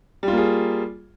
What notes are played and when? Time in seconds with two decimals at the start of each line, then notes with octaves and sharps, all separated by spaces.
0.23 G3
0.28 F4
0.33 A#3
0.38 G#4